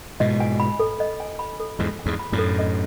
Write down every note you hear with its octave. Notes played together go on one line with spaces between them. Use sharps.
G#2 B2 D#5
G#5
B5
A4
D#5
G#5
B5
A4
E2 G#2 D#5
G#5
E2 G#2
B5
F#2 A2
A4
D#5